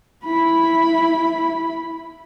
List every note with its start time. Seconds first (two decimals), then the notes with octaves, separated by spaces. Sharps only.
0.25 E4 B5